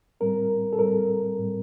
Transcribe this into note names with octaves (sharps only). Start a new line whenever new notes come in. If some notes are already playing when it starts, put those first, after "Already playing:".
A2 G3 C4 A#4
A4
A2 G3 C4 A#4
A2 G3 C4